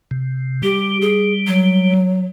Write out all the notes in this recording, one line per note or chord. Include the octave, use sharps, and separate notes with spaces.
C3
G3 G4
G#4
F#3